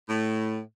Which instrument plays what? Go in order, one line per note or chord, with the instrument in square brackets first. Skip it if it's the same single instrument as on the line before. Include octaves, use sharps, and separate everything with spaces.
[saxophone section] A2